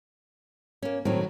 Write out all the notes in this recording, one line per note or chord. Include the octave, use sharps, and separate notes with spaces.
A#3 C#4
A2 D#3 F#3 C4